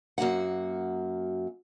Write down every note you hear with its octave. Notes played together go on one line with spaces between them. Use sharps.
F#2 F#3 A#3 F#4 F#5